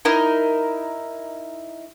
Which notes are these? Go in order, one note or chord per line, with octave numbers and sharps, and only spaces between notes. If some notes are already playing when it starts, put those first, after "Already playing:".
D#4 E4 A#4